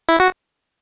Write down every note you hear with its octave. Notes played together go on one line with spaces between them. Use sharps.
E4
F#4